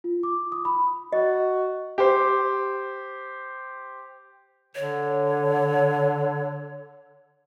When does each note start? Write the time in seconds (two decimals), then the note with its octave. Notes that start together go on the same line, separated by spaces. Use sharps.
0.04 F4
0.23 D6
0.52 D#6
0.65 B5
1.13 F#4 D#5
1.98 G4 C5
4.75 D3 C#5